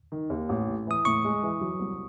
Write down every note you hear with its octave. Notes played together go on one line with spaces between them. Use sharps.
D#3
D#2
A1
A2
E3 D#6
A2 C#6
G#3
E3
F#3
C2